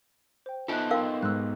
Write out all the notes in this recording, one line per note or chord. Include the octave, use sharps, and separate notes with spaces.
C5 G5
B3 D#4 F4 A4 E5 G#5 A5 F#6
A#4 D#5 F5 G5 C6
G#2 E6 F#6